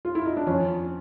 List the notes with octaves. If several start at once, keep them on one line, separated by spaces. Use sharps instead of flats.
F4
E4
D#4
D4
F2 C#4